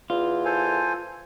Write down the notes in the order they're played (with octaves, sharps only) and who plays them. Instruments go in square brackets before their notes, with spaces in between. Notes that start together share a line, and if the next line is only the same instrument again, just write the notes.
[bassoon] E2 [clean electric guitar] F4
[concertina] A4 C5 G#5